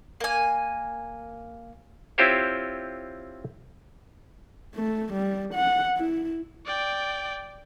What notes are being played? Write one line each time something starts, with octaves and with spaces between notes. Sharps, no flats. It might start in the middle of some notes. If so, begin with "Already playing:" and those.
A#3 G#5
C4 E4 F4 G4 C5 C#5
A3
G3
F#5
E4
D5 G5